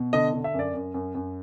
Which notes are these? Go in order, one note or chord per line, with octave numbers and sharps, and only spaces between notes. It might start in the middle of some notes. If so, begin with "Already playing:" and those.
Already playing: B2
D3 D#5
D3
E5
F#2 D5
F#2
F#2
F#2